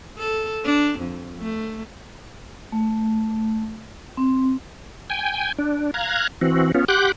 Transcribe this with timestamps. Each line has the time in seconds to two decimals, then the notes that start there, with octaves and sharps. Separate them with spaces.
0.18 A4
0.65 D4
0.99 F2
1.38 A3
2.72 A3
4.17 C4
5.10 G5 G#5
5.59 D4
5.94 F5 A#5 F#6 G#6
6.41 E3 C4 F#4
6.75 B3 C#4 F4
6.88 G4 F#5 C6 D6 F#6 G6